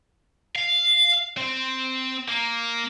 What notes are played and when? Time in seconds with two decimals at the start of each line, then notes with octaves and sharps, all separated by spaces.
0.56 F5
1.37 C4
2.28 A#3